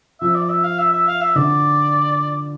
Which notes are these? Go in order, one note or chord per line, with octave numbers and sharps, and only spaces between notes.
F3 E5
D5
E5
F5
E5
E5
F5
E5
D3 D5